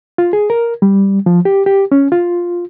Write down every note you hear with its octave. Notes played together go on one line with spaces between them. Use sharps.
F4
G#4
A#4
G3
F3
G4
G4
C#4
F4